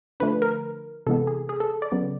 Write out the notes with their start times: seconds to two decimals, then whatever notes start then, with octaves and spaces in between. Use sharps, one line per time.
0.20 D3 F3 A3 D4 B4
0.42 A#4
1.07 C3 E3 G#3 B3 A4
1.27 G#4
1.49 G#4
1.60 A4
1.82 D5
1.92 C#3 F#3 B3